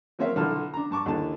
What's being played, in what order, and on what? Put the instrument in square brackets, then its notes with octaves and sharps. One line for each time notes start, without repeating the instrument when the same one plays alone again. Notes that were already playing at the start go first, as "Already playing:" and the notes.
[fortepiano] F#3 A#3 C4 C#5 E5 F5
B1 D3 E4 F4 A5 F6
D4 A#5
G2 A5 C#6 D6
D#2 D3 E3 A5